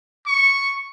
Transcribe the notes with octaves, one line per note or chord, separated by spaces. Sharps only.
C#6